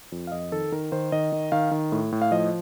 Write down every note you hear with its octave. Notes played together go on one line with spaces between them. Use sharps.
F2
F5
F2 D#5
D#3 A4
D#3 A#4
D#3 C5
D#3 D#5
D#3
D#3 F5
D#3
A2
A2
F5
F3 D#5